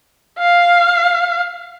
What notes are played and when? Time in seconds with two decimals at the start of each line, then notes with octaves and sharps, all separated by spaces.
0.39 F5